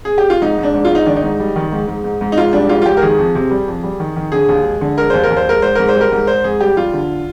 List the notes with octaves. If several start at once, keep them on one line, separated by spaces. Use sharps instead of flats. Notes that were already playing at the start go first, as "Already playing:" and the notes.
G#4
G4
F4
G#2 D#4
G#2
D4
G#2
F4
G#2
D#4
D#3 D4
D#4
G#2
G3
D#3
G#2
G#2
G#2
G#2
D#4
G#2 F4
G3 D4
G#2 F4
F4
G#2 G4
A#4
D#3 G#4
F2
C3
G3
F2
G3
D#3
D#3
D3 G#4
D#2
G#3
D3
G#3 A#4
D#2 C5
A#4
D#2
C5
G#3 A#4
G#2 C5
G#2 A#4
C5
G3
A#4
G#2
G#2 C5
G#2 G#4
G3 G4
G3 F4
D3